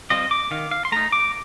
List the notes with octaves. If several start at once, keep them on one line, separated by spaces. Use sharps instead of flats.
G3 C4 F4 D#5
D6
D#3 F5
F5
C6
A3 D#4 A#5
D6